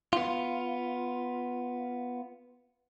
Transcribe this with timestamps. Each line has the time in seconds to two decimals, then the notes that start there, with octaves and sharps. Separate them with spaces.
0.13 B3 F4